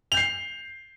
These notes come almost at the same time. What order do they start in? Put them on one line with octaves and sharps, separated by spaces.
F7 G6 C7